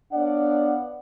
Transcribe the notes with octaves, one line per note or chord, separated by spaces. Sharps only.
B3 D4 C#5 D5 F5 F#5